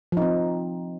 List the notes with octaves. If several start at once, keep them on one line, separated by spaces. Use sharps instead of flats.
F3 C4 D#4